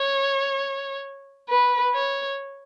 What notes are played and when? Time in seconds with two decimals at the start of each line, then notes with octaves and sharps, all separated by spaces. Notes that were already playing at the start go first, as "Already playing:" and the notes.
Already playing: C#5
1.49 B4
1.94 C#5